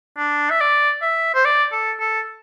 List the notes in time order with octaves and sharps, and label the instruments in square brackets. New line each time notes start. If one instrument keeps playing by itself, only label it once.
[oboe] D4
E5
D5
E5
C5
D5
A4
A4